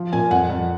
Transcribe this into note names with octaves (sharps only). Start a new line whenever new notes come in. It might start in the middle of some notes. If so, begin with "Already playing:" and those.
Already playing: F3
A#2 G#5
F2 F#5
F2